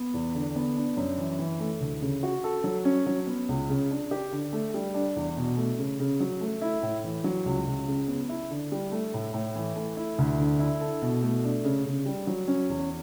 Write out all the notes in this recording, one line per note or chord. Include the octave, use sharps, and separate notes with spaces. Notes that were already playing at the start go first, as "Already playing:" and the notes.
Already playing: B3
E2
D3
B3
D4
F#2
E3
E3
A3
D2
C#3
F#4
A4
F#3
C#4
F#3
B3
C#2
C#3
D4
G4
D3
A3
G3
D4
E2
B2
A3
C#3
C#3
F#3
A3
E4
A2
E3
F#3
C#2
C#2
C#3
B3
E4
D3
G3
A3
A2
A2
E3
A3
E4
D2
D3
E4
A4
B2
A3
D4
C#3
C#3
G3
F#3
C#4
E2